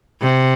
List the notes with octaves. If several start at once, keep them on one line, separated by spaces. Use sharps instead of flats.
C3